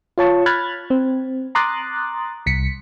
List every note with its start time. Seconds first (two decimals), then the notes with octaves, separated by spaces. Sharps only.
0.18 F4 C#5 A5 C#6
0.46 B5 F6 F#6 G#6 A6
0.90 C4
1.55 A#5 C6 D6 D#6 F#6 A6
2.46 C2 B6 C#7